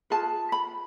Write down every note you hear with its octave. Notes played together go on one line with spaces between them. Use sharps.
F4 G#4 B4 A5
B5